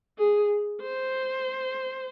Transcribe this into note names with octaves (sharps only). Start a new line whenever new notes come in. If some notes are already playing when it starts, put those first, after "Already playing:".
G#4
C5